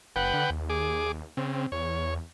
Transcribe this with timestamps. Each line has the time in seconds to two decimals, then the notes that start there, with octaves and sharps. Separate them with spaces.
0.16 F#1 B4 F#5 G5
0.33 D3
0.50 D#2
0.70 G#4 D6
1.37 C#3 C4
1.72 E2 C#5